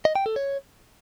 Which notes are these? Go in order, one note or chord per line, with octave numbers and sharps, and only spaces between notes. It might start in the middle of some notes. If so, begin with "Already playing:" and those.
D#5
G5
A4
C#5